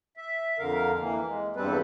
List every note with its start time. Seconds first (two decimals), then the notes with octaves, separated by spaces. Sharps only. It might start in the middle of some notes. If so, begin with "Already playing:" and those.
0.17 E5
0.59 F2 D3 A#4 F5
1.01 E3 A#3
1.27 G#3
1.56 E2 G2 G3 C4 A4 B4